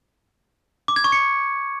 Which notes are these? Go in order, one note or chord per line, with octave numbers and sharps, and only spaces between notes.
D6
G#6
C#6
C#7